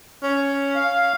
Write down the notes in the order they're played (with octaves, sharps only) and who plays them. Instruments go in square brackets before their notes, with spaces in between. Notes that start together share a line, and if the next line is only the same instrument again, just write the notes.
[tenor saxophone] C#4
[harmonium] F5